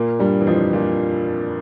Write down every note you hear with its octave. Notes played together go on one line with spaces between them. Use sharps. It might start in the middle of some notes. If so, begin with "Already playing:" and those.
Already playing: A#2 A#3
G2 G3
E3
F2 F3
A#2